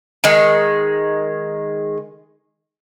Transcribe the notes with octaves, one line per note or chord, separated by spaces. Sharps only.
D#3 G#3